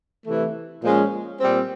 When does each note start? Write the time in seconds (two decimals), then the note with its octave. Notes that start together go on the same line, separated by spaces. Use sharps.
0.26 C3 E3 A3
0.83 A#2 F3 G#3 C#4
1.41 A#2 G3 C4